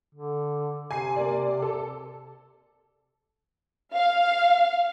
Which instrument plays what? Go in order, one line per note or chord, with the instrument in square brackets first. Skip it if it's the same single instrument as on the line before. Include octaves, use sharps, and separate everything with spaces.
[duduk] D3
[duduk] C3 [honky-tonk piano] G#5 C7
[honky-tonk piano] A#3 D5
A4
[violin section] F5